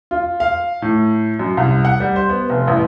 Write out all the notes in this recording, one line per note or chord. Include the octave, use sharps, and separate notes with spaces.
F4
F5
A2
F#2
C2
F#5
G3
C5
B3
F1
A1